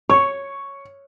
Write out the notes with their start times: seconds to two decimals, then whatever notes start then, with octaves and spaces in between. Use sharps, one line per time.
0.10 C#5 C#6